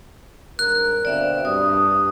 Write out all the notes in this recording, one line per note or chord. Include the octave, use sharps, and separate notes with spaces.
G#1 G2 A#4 F#6
B2 D3 C4 D5 E5 F5
G2 D#6